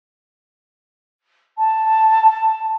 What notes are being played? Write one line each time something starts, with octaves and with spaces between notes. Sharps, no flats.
A5